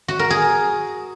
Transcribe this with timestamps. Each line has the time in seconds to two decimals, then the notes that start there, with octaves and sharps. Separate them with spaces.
0.08 F#4
0.19 A#4
0.30 G#4